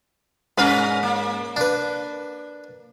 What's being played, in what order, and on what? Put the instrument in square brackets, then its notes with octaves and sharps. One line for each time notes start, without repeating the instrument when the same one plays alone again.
[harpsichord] G#2 [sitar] C#4 A#4 B4
[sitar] A#3
[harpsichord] D4 B4